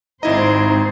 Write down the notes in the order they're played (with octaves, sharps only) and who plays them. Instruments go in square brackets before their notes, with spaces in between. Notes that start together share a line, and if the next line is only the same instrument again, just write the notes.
[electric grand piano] G#1 E4 D#5 [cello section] G#2 C4 C5 [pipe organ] D#4